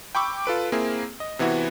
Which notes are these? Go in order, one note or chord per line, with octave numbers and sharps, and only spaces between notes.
G5 B5 C#6 D6 E6
F4 A4 B4 D7
A#3 C4 E4 G#4
D#5
C3 E3 B3 E4 F#4